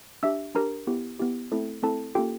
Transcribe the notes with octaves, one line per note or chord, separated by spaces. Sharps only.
D4 G4 E5 E6
D4 G4 A#4 A#5
B3 E4 G4
B3 E4 G4
A3 C4 E4 A4
A3 C4 E4 A4 A5
A#3 C#4 F4 G4 A4 G5